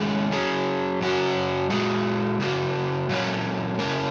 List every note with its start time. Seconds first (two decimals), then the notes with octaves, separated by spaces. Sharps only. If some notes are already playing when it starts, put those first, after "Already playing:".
Already playing: D#3 G#3 C#4 G#4
0.32 F#3 C#4 G#4
1.01 F#2 C#3 F#3 C#4 F#4
1.70 A#2 G#3 F#4
2.40 C#3 A#3 F#4
3.09 A#2 F#3 A#3 C#4
3.79 C#3 A#3 C#4 A#4